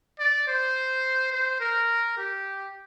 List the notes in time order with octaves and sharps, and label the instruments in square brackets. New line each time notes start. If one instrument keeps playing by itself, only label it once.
[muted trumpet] D5
C5
C5
A#4
G4